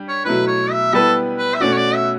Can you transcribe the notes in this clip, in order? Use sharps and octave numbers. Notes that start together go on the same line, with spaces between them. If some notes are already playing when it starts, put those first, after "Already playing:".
Already playing: G3 D4 G4
C#5
B2 F#3 A3 E4 B4
C#5
E5
G3 B3 E4 A4 B4
B4
E5
B2 A3 C#4 F#4 D5
C#5
D5
E5